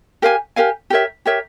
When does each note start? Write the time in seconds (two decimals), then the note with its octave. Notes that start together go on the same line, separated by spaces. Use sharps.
0.22 G4 A#4 F5 G#5
0.56 G4 A#4 F5 G#5
0.90 G4 A#4 C#5 E5
1.25 G4 A#4 C#5 E5